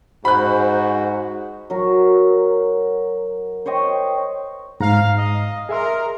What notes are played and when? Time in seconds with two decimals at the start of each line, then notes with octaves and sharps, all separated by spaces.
0.25 G#2 F#4 C5 B5 F#6
1.70 F#3 A#4
3.66 C5 C#5 D#5 G5
4.80 G#2 F5 A#5
5.18 D#5
5.69 G#4 A#4 E5 C6